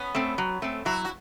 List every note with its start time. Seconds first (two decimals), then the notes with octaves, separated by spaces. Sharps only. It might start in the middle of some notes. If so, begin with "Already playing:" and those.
Already playing: B3 C#4
0.15 A3 C4
0.38 F#3
0.62 A3 C4
0.85 F#3 E4 F#4
1.05 F#4